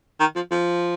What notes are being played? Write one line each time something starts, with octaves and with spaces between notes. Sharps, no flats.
D#3
F3
F3